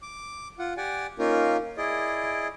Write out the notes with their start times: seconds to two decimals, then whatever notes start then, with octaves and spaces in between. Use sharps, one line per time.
0.02 D6
0.59 F4 F#5
0.77 G4 D5 F#5 G#5
1.19 A#3 C#4 D#4 F4 A#4
1.77 E4 G#4 D5 D#5